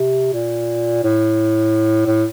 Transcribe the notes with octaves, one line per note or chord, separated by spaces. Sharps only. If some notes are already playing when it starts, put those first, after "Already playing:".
Already playing: C3
A#2
A2
A2